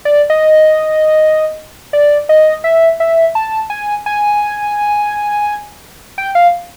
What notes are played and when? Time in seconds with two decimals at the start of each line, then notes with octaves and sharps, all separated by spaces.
0.05 D5
0.30 D#5
1.93 D5
2.29 D#5
2.64 E5
3.00 E5
3.35 A5
3.70 G#5
4.06 G#5
6.18 G5
6.35 F5